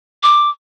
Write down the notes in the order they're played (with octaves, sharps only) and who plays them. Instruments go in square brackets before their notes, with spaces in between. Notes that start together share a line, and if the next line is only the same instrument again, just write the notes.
[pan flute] D6